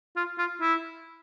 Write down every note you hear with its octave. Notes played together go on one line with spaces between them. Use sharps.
F4
F4
E4